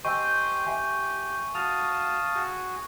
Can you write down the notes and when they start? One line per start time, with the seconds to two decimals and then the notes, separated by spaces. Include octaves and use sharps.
0.05 G4 C5 D#5 G5 G#5 C#6 E6
0.66 G4 E5 G#5
1.55 F#4 F5 A5 D#6 F7
2.35 F#4 G#4